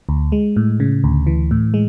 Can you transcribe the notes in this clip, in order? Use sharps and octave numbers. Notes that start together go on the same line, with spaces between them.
D2
G#3
A2
C#3
D2
E3
A2
G#3